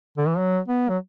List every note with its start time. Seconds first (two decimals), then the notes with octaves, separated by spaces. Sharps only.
0.18 D3
0.28 E3
0.38 F#3
0.68 B3
0.89 F#3